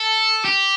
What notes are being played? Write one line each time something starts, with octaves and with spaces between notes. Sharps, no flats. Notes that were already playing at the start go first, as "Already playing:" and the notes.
Already playing: A4
G4